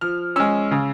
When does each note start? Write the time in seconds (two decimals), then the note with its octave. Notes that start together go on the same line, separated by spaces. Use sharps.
0.01 F3 F6
0.36 G#3 C#4 E6
0.71 C#3